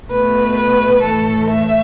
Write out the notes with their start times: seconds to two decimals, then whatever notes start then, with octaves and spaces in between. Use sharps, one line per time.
0.11 B2 A3 B4
0.57 B4
1.03 A2 E3 A3 A4
1.50 E5